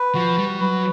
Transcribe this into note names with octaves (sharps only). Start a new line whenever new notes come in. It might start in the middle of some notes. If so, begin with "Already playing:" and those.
Already playing: B4
F3 F#4
G3
F#3 B4